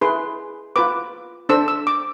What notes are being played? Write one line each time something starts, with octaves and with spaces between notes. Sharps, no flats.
E4 G#4 B4 C6
F4 B4 D6
D4 A4 C5 E6
E6
D6